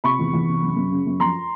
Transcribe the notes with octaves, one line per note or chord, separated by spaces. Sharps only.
C3 B5 C#6
E2
E2
C3
F#2
F#2
C#3
F#2
F2 A#5 C6